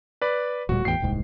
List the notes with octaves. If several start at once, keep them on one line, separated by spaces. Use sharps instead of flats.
B4 D5 B5
D1 A#2 G3 F#4
A1 E2 A2 G5 C7
D#1 C2 G#2